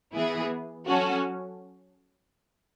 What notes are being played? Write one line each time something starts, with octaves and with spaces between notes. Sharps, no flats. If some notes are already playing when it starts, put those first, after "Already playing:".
E3 B3 E4 G#4
F#3 C#4 F#4 A4